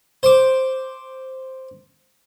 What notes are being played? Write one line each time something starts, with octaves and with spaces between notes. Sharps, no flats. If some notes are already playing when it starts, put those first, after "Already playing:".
C5 D6